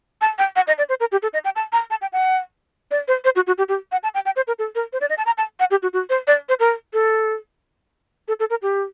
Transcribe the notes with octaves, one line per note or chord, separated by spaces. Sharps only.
A5
G5
F#5
D#5
D5
C5
A#4
G4
A4
D#5
G5
A5
A#5
A5
G5
F#5
D5
C5
C5
F#4
F#4
G4
G4
F#5
A5
G5
G5
C5
A#4
A4
A#4
C5
D5
D#5
A5
A#5
A5
F#5
G4
F#4
F#4
C5
D5
C5
A#4
A4
A4
A4
A#4
G4